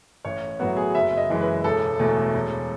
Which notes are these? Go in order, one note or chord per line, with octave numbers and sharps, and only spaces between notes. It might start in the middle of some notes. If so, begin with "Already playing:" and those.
A1 C#5
A2 F#3 B3 F#4
G#4
F#1 E5
D#5
F#2 E3 G#3
B4
E1 A4
E2 B2 A3
E1